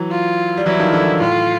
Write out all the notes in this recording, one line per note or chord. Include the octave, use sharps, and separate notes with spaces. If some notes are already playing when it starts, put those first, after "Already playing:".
Already playing: E3 F#3
F4
G3
E3 F#3 E4
D#3 F3
D3 E3
A2 F4